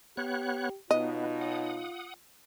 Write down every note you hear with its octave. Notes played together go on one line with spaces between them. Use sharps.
B3 G4 C#5 F#6
B2 B3 D#4 F4 C#5 D#5
F#5 D#6